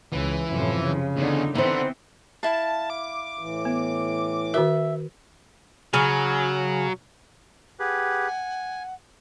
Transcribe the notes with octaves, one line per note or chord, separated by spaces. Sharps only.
C#2 E3
F#2 A2 C3 F3
C#3
E2 D3 D#4
D3 E3 B3 C4 D#4 C5
E4 F5 A5
D6
A2 E3
B3
D#3 F#4 A#4 E5
C#3 F#3 G#5
G4 G#4 B4 F#5
G#5